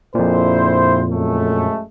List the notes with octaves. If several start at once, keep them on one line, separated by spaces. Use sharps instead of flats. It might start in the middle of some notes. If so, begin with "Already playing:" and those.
A#1 F2 A#2 E4 C5
F#2 G#3 A3